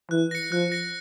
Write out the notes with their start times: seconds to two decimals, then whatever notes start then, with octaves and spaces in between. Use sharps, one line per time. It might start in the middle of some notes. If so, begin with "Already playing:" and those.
0.11 E3 F#6
0.31 A#6 C#7
0.52 F3 F#6
0.72 A#6 C#7